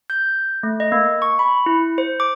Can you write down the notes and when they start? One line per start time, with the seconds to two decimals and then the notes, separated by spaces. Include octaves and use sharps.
0.10 G6
0.63 A3
0.80 D#5
0.92 A#3
1.22 C#6
1.39 B5
1.66 E4
1.98 C5
2.20 D6